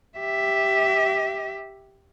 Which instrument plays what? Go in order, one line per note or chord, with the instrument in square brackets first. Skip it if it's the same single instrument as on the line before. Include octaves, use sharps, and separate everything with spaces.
[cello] G4 E5